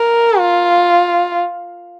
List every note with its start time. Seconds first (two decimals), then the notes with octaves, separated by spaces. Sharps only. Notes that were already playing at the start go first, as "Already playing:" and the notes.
Already playing: A#4
0.39 F4